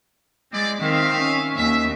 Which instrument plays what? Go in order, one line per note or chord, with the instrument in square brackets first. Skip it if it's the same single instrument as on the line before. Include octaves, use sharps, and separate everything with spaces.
[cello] G#3 [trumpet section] C4 E4 D5
[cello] D#3 C4 [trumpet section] E5 F5
[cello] C#4
[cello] D#2 [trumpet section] E5